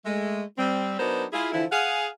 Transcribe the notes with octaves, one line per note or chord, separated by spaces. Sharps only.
G#3 A3
G3 C4
F#3 B3 D4 D#4 A#4 C5
E4 F4 G#4
D3 E3 F3 E4
G#4 F5 F#5